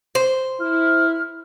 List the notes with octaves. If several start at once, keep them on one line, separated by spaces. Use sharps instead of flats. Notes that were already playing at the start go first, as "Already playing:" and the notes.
C5
E4 F6